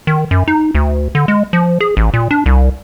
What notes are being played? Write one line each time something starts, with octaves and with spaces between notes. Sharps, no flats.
D#3
F#2
D#4
D2
D3
G#3
F3
G#4
A1
A#2
D4
C2